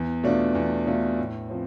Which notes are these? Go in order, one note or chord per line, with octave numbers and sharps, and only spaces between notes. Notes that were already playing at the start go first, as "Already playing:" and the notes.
Already playing: E2
B2 A3 D4 F4
E2
B2 A3 D4 F4
A2
F3 C4